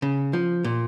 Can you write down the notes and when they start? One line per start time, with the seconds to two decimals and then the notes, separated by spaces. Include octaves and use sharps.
0.02 C#3
0.33 F3
0.64 A#2